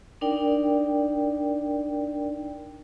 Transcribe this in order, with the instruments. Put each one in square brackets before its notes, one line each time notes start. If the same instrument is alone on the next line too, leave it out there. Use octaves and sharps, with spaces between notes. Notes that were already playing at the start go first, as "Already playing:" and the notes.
[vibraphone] D4 D#4 A#4 D5 G5